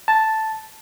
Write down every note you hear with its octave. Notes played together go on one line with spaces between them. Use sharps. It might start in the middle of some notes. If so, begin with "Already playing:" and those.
A5